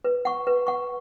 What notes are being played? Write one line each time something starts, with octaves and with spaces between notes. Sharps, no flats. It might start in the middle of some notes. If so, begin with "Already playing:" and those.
B4
F#5 C#6
B4
F#5 C#6